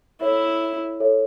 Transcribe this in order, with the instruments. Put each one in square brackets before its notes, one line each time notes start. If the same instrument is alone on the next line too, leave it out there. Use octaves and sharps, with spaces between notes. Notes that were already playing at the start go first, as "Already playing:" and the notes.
[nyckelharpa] E4 [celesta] A4 C#5 E5
[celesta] A4 C#5 E5